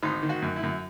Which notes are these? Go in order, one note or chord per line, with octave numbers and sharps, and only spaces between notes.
G#1 D#4
D#3
F#4
F#2
E4
F#2